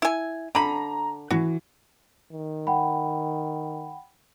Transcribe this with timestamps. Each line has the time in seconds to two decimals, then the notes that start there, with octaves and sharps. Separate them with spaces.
0.02 E4 G#5
0.55 D3 A#5 B5
1.30 E3 F#4
2.32 D#3
2.67 F#5 G5 B5